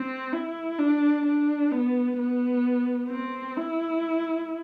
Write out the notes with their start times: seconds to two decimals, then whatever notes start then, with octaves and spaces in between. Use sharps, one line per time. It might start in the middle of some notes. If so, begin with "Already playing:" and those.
Already playing: C4
0.33 E4
0.79 D4
1.26 D4
1.71 B3
2.18 B3
3.09 C4
3.57 E4